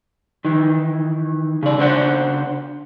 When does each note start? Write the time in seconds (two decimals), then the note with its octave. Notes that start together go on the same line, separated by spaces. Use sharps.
0.45 D#3 E3
1.63 C#3 D5
1.78 C#3 D4 C5 F#5